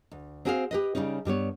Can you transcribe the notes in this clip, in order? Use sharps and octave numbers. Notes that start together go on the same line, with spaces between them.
D2
C4 F#4 G#4 C5 C#5 F5
G4 B4 D#5
C#3 F3 G3 C#4 D#4
G2 G3 B3 C#5